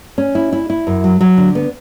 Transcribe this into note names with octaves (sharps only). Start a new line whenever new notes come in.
C#4
E4
E4
E4
F#2
F#3
F#3
D3
B3